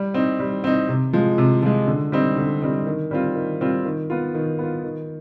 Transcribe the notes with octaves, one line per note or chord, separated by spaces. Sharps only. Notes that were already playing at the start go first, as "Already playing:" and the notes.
Already playing: G3
C4 D#4
G3
C4 D#4
C3
F3 G#3
C3
F3 G#3
D3
G3 C4 D#4
D3
G3 C4 D#4
D#3
G3 C4 F4
D#3
G3 C4 F4
D#3
B3 F4
D#3
B3 F4
D#3